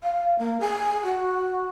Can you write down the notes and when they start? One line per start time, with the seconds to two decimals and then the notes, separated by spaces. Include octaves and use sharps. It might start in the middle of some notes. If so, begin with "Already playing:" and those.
0.03 F5
0.39 A#3
0.60 G#4
1.04 F#4